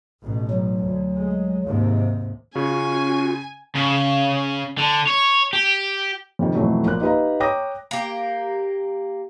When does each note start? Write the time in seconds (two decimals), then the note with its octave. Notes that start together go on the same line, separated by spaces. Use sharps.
0.21 A1 B2
0.50 F#3
0.84 D2
1.17 G#3
1.65 D#2 G#2 C3
2.55 C#3 C#4 F4 F#4 G#5
3.75 C#3
4.78 D3
5.07 C#5
5.53 G4
6.39 F2 C3 D#3
6.55 F2 B2 E3 F#3 A3
6.86 A#1 A#3 F#6
7.01 D#4 G4 B4 D#5 F5 A#5
7.40 C#5 G5 A#5 D6 D#6 A#6
7.91 A#3 G4